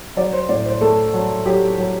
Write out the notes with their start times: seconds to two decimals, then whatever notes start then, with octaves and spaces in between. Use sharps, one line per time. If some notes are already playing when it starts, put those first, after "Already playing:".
0.17 F#3 D5
0.33 C5
0.49 A2 D5
0.66 C5
0.81 A3 A4
1.14 F#3
1.46 F#3 G4
1.78 F#3